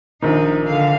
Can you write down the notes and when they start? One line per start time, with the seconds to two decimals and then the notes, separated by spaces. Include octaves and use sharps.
0.22 A#1 D#3 D#4
0.66 D3 F5